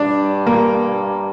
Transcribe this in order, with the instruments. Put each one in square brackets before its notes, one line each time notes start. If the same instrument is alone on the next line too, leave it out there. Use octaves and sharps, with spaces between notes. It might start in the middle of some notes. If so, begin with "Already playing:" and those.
Already playing: [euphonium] G2 [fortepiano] D4
[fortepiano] A#3